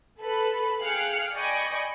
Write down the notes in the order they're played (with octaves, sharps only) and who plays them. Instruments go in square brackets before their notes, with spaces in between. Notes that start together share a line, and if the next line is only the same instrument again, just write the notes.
[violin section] A4 B4 B5
G#4 F5 G5 F6 F#6 C#7
D5 D#5 G5 G#5 B5 C#6